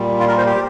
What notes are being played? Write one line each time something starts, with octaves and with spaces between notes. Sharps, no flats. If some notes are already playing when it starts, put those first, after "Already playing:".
Already playing: A#2 G3
F4
A#4
C5
G4